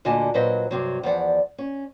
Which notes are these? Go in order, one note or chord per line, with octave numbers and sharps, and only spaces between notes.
D2 A#2 D3 D#5 G#5 A5
A#2 F#3 B4 C5 D#5
G2 C3 F#3
E2 F3 D5 F#5
C#4